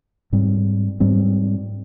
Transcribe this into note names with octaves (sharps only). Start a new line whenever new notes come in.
G#2 G3 C4
G#2 G3 C4